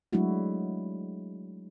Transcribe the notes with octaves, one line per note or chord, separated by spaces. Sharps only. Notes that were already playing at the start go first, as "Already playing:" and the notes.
F#3 G#3 A3 D4 E4 F#4